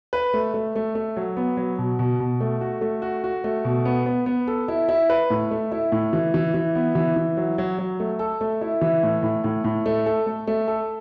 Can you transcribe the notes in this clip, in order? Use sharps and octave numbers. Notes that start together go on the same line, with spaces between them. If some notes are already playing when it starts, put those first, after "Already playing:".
B4
A3
A3
A3
A3
F#3
B3
F#3
B2
B2
B2
A3
F#4
A3
F#4
F#4
A3
B2
B3
B3
B3
A4
E4
E4
B4
A2
A3
E4
A2
E3
E3
E3
B3
E3
E3
F#3
F#3
F#3
A3
A4
A3
E4
E3
A2
A2
A2
A2
A3
A4
A3
A3
A4